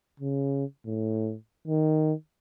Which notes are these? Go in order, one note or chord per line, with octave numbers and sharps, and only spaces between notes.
C#3
A2
D#3